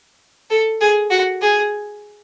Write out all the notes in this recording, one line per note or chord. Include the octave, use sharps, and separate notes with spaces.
A4
G#4
F#4
G#4